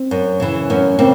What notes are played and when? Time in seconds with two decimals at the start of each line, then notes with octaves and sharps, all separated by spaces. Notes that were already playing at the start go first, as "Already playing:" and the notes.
Already playing: C4
0.11 F#2
0.40 C#3 E3
0.70 F#2 B3 C#4
0.99 C#3 A#3 C4